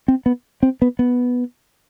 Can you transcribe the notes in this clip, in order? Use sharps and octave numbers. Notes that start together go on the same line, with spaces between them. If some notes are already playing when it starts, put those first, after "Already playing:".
C4
B3
C4
B3
B3